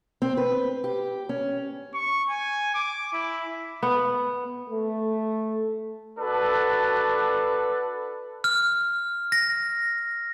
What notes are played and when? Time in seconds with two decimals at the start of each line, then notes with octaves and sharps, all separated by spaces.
0.22 C4
0.37 B4
0.84 G4
1.29 C#4
1.94 C#6
2.29 G#5
2.75 D6
3.13 E4
3.83 B3
4.70 A3
6.17 D4 F#4 A4 B4
8.44 F6
9.32 A#6